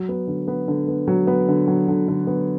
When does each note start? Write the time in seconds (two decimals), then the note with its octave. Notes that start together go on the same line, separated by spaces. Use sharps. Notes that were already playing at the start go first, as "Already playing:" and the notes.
Already playing: F#3
0.09 B3
0.27 D3
0.48 B3
0.68 D3
0.88 B3
1.08 F#3
1.27 B3
1.48 D3
1.68 F#3
1.88 D3
2.08 D3
2.27 B3